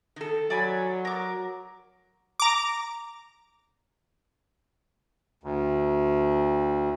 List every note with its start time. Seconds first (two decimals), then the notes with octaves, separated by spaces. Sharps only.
0.16 D#3 A4
0.50 F#3 D5 G#5 B5
1.05 A#4 D6
2.40 A#5 D6
5.43 D2